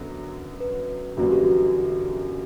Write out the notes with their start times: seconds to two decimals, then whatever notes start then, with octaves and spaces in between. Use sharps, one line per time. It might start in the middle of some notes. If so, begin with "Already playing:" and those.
Already playing: F#2 D3 F#3 B3 F#4
0.60 B4
1.17 G1 F#2 E3 G3 A#3 F#4
1.31 G4
1.44 F#4